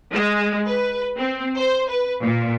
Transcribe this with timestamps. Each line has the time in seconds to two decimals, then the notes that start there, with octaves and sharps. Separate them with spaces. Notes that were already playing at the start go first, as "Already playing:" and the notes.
0.12 G#3
0.67 B4
1.18 C4
1.57 C5
1.89 B4
2.22 A#2